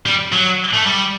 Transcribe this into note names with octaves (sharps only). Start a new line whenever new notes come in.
G3
F#3
A3
G3